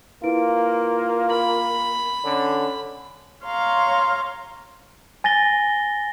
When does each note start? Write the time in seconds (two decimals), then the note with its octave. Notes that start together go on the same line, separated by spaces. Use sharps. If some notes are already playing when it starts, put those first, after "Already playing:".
0.24 A#3 E4 F4 B4 D7
1.30 B5 F#7
2.24 D3 C#4
3.44 C#5 F5 A#5 C6
5.24 G#5 A6 A#6 G7